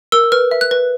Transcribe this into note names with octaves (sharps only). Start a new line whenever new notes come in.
A#4 E6
B4 F6
E5
F#6
B4